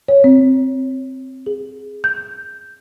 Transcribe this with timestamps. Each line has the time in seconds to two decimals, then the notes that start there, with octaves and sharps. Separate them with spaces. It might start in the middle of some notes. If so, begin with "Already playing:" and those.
0.08 C#5
0.24 C4
1.46 G#4
2.04 G6